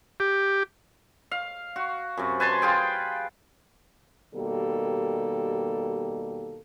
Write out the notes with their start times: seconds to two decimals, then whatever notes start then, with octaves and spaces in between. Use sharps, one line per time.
0.20 G4
1.31 F5
1.76 F#4
2.17 F#2 C3
2.40 B4 G#5 A5 C6
2.62 F4 G#4 G5
4.34 B2 D#3 G3 A#3 G4 A4